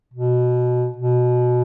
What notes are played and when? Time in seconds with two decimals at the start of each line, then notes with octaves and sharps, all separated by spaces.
0.14 B2
0.97 B2